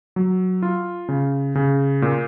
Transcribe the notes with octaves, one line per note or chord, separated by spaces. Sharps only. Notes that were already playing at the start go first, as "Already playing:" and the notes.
F#3
F4
C#3
C#3
A#2